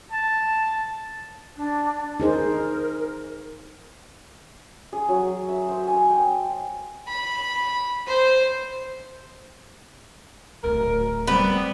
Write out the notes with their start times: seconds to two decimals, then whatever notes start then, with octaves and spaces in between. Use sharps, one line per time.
0.12 A5
1.57 D4
2.20 D#4 G#4 A#4 C5
4.92 G#4
5.08 F#3
5.48 E5
5.69 C5
5.87 G#5
6.10 G5
7.07 B5
8.07 C5
10.63 D1 D2 A#4
11.27 G3 B3 C4